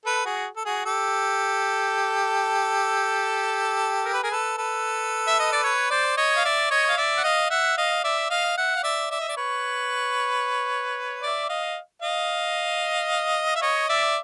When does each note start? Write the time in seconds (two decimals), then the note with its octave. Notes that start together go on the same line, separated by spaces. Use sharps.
0.05 A4 B4
0.25 F#4 G#4
0.57 A4
0.65 F#4 G#4
0.86 G4 A4
4.05 A#4
4.13 B4
4.23 G#4 A#4
4.31 A4 B4
4.58 A4 B4
5.28 E5
5.39 D#5
5.52 D5
5.64 B4 C#5
5.90 C5 D5
6.17 C#5 D#5
6.37 F5
6.45 D5 E5
6.71 C#5 D#5
6.89 F5
6.97 D5 E5
7.18 F#5
7.24 D#5 F5
7.50 E5 F#5
7.77 D#5 F5
8.04 D5 E5
8.30 D#5 F5
8.57 E5 F#5
8.76 F5
8.83 D5 E5
9.11 D5 E5
9.20 D#5
9.29 D5
9.37 B4 C#5
11.23 D5 E5
11.49 D#5 F5
12.02 D#5 F5
13.56 E5
13.62 C#5 D#5
13.89 D5 E5